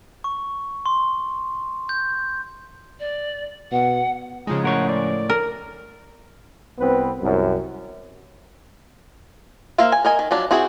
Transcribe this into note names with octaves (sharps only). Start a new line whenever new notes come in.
C#6
C6
G6
D5
B2 F#5
C#3 F3 G#3 D#4
A2 A#4 C#5 F#5
D5
A#4
C2 B3 C4 B4
C2 F#2
A#3 A#4 C5 E5 F5
G#5
A#4 D#5 G#5
D#3
F3 F#3 D4
C4 E4 F#4 G#4